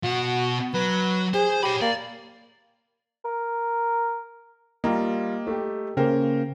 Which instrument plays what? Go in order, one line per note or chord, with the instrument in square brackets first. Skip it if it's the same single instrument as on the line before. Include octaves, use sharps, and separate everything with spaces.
[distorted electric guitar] B2 F#5 [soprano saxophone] F#4
[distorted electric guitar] F#3 [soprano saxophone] B4
[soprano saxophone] G#4 [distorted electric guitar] C5
[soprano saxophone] G4 [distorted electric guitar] C#5 B5
[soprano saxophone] A#3 [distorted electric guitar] D5
[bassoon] A#4
[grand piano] G3 F4 [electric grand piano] A#3 [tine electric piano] D#5 A#5
[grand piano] A3 G4
[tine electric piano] C#3 A#3 [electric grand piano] C#4 A#4 C5 [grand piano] F5 G5